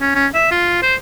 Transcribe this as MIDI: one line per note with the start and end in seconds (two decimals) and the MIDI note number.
0.01 0.10 61
0.15 0.27 61
0.34 0.49 76
0.51 0.81 65
0.83 0.95 72